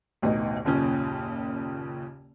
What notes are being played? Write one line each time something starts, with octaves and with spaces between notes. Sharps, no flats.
A1 D2 B2 D#4
F#1 D#2 A#2 C#3 C#4